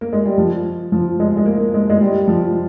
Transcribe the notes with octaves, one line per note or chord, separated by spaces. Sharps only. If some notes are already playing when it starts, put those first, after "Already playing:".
A#3
G#3
G3
F3
F3
G#3
G#3
A#3
G#3
G#3
G3
F3